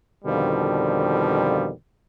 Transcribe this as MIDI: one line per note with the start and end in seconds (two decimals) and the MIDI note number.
0.24 1.71 41
0.24 1.71 47
0.24 1.71 50
0.24 1.71 51
0.24 1.71 53
0.24 1.71 55